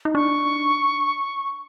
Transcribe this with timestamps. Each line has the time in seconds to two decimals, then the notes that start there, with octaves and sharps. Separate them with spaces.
0.05 D#4
0.15 D4 C#6